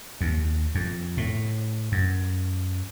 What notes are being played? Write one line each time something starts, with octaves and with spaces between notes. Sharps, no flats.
D#2
F2
A2
F#2